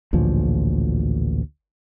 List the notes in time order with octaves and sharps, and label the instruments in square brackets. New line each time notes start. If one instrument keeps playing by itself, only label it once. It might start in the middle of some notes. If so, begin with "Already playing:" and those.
[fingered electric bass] A1 D2 A#2 F3